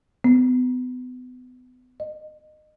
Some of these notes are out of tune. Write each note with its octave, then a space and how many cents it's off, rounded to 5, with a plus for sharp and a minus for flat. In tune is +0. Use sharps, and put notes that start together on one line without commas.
B3 +30
D#5 -25